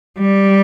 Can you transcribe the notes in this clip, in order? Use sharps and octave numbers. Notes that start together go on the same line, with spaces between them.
G3